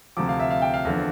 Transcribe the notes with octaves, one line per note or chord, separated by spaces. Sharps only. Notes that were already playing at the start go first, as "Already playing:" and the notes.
D2 C3 F3 D6
F5
E5
F5
G5
F5
E2 D3 F3